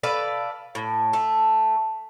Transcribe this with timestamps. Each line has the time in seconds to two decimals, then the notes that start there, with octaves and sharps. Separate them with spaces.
0.03 A4 B4 D5 F5
0.75 A2
1.13 A3